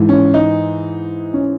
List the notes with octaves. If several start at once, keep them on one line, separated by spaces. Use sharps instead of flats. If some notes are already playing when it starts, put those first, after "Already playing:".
Already playing: G#2 E3
C#4
D#4
C#4